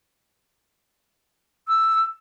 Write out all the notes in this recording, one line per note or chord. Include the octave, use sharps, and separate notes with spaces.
E6